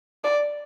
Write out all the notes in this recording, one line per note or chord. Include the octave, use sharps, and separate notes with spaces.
D5